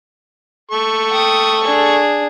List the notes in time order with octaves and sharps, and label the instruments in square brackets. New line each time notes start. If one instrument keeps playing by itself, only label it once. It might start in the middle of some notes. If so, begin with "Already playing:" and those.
[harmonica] A4 C#6
[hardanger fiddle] G5 D#6
D4 G#4